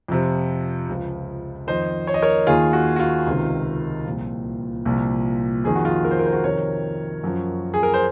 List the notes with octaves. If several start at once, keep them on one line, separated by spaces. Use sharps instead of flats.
F2 C3 F3
C#2 C#3 F3
F2 D#3 C5 D#5
C#5
D#5
A#4 C#5
D#2 D#3 F4 G#4
F#4
F#4
F4
C#2 C3 D#3
C2 A#2 F3
C2 A#2 F3
F2 D#3 G#4
F#4
F4 G#4
A#4
C5
A#4
C5
F#4 A#4
F2 C3 D#3 A#4 C#5
F#2 F3
G#4
A#4
C5